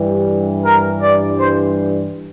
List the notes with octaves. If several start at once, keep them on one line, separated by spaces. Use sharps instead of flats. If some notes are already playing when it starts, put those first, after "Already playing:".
Already playing: G2 E3 G3
A#4
D5
C5